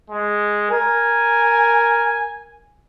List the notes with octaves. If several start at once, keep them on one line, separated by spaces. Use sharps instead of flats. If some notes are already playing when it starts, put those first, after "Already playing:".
G#3
A#4 G#5